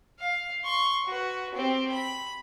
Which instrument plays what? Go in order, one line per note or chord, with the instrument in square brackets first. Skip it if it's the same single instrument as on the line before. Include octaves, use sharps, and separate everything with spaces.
[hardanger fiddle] F5
C6 C#6
F#4 B4
C4 G4
B5